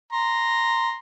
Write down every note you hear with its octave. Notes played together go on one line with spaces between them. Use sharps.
A#5 C6